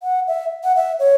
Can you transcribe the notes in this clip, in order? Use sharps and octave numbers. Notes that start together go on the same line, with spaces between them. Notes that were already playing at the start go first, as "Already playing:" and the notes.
F#5
E5
F#5
E5
C#5